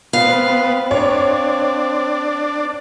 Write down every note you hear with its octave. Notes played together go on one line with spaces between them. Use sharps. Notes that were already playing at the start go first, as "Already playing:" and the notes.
B3 C4 F5
D4 C#5